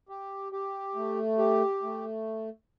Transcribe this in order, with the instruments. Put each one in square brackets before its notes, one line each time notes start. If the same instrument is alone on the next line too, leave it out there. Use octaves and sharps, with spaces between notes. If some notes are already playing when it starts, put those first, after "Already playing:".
[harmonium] G4
G4
A3
G4
A3